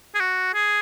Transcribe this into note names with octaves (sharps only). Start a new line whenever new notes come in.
G#4
F#4
G#4